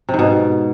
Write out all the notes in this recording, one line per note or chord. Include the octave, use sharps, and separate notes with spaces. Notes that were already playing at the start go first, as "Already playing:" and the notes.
C3
G#2
B2